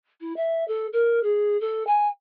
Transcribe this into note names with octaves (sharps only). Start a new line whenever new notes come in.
E4
E5
A4
A#4
G#4
A4
G#5